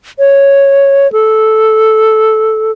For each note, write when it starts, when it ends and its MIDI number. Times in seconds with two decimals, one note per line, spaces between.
0.19 1.10 73
1.12 2.71 69